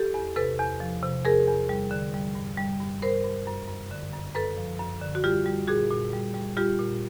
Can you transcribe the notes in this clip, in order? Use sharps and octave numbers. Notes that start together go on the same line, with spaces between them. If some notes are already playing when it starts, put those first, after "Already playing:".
Already playing: G4 A4
E2
C3 A4 B4
E2
F3
C3
E2 G#4 A#4
E2
G3
D3
G3
G2
G3
G2
G2 A#4 C5
G2
F#2
F#2
D3
F#2
F#2 A4 B4
F3
F#2
D3
F#4
G3 F4 G4
G3
A#2 F#4 G#4
A#2
G3
G3
G3 F4 G4
A#2